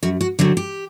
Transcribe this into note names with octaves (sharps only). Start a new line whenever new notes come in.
F#2 F#4
F#4
D3 F#3 C4 F#4
G4